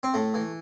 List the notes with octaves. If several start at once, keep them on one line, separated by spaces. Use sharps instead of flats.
C4
A2 A3
E3